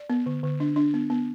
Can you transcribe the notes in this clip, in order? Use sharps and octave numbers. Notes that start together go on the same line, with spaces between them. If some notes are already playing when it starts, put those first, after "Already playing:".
Already playing: D5
B3
D3
D3
D4
D4
B3
B3